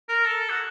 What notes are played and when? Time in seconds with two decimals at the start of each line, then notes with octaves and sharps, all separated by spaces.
0.09 A#4
0.25 A4
0.50 F#4